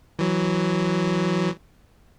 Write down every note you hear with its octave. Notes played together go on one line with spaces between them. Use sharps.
E3 F#3